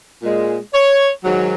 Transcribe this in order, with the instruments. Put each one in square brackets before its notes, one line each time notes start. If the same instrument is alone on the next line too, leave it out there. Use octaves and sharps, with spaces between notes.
[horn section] A#2 G#3
C#5
G#2 D#3 F#3